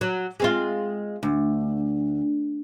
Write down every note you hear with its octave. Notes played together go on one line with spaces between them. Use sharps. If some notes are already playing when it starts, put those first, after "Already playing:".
F#3
G#3 C4 F4
D2